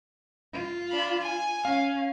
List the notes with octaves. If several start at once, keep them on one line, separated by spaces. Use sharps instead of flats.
F4
D4 B5
G#5
C#4 F5